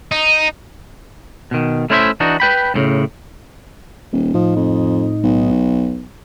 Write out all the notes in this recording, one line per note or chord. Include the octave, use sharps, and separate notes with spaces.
D#4
B2 D#3
A3 C#4 E4 C5 D5 E5
E3 D4 D#4 F#4
B4 G5 B5
D2 A2 C#3
D#1
A2 F3 D#4
F2
B1